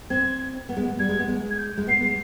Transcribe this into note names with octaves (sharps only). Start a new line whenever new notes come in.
C4 G#6
B3
G#3
B3
G3 G#6
G#3
B3
G#3
G#6
G6
G#3
B3 C7
G#3